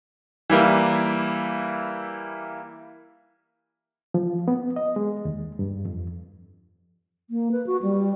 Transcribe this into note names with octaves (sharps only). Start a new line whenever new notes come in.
E3 G3 A#3 E4
F3
B3
D#5
G#3
D#2
G2
F2
A#3
B4
F#4
G3